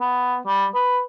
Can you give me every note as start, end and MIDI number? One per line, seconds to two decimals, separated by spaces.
0.01 0.37 59
0.47 0.67 55
0.74 1.01 71